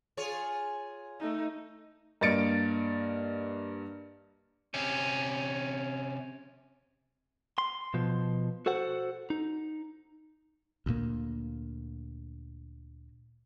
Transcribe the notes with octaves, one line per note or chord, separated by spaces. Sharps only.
F4 G#4 C#5
A3 D#4
G2 A#3 D#5 A6 C#7 D7
C3 C#4
C6
B2 F3
F#4 A4 C5 F#5
D#4
D2 A#2 A#3